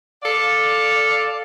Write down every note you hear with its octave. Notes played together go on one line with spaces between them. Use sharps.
A4 D5 F5